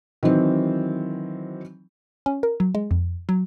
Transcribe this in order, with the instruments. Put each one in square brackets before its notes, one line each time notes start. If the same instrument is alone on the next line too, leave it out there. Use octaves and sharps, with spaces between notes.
[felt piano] D#3 E3 F#3 C4
[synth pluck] C#4
A#4
F#3
G#3
F2
F#3